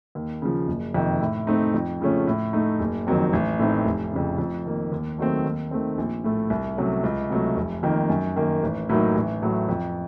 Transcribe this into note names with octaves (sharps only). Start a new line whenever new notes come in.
D#2
C#3 F3
F#1
F2 C3 D#3
A2
A3 C4 D#4
F2
C#3 F3 A3 C#4
A2
A3 D#4
F#1
F2 D#3 F#3 C4
A1
A2 A3 C4 D#4
F1
F2 C#3
F2
D#3 A#3
D#2
D#3 F#3 A3 C4
D#2
D#3 A3 C4
A#1
A2 A3
C2
C3 F#3 A3 C#4
C#2
C3 F#3 A3
F1
F2 D#3 A#3
F#2
D#3 A#3
A1
A2 F#3 A#3 D#4
A1
A2 F#3 A3
F2